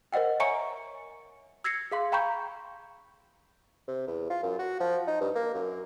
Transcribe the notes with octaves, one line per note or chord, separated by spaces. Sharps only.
A#4 C5 D#5 F#5 G5
C#5 E5 G#5 A#5 C#6 C#7
E6 G#6 A#6 C7 C#7
G#4 F5 C6
F5 G5 A#5 B5 C#6 G6
C3
E2
F4
F#2
F#4
F3
D#4
G2
A#3
F#2